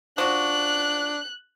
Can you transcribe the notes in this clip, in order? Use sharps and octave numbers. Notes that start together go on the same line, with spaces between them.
F3 D4 F#4 F#6